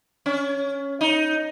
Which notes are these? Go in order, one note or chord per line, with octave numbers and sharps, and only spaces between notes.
C#4
D#4